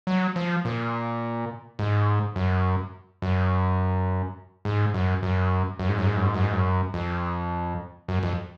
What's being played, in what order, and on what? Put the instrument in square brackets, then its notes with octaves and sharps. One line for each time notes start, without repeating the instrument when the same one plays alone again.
[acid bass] F#3
F3
A#2
G#2
F#2
F#2
G#2
F#2
F#2
F#2
G#2
F#2
G#2
F#2
G#2
F#2
G#2
F#2
F2
F#2
F2